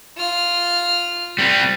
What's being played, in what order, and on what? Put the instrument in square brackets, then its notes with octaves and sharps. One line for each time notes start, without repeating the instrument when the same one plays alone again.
[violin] F4 F6
[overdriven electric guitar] G3 C4